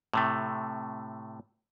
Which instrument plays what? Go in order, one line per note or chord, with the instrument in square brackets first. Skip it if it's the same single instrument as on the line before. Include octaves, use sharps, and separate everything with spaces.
[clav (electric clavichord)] A2 C3 A3